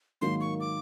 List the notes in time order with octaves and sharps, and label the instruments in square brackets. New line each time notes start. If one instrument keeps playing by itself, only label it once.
[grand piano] G#2 D#3 F#3 A#3 [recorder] C6
[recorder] C#6
D6